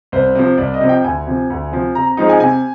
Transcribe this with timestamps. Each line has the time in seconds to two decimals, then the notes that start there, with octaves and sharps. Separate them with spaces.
0.12 C2 C5
0.35 C3 F3
0.58 C2 D5
0.74 D#5
0.81 C3 F3
0.89 G5
1.04 D2 G#5
1.27 C3 F3
1.50 D2
1.72 C3 F3
1.95 C3 A#5
2.06 A#5
2.17 F3 G#3 C4 D#4 A#5
2.29 G#5
2.40 C3 G#5